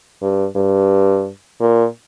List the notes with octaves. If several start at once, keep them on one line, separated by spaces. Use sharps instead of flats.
G2
G2
A#2